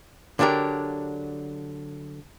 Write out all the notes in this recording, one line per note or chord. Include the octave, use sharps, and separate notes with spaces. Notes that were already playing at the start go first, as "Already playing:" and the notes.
D3 F#3 D4 G4 A#4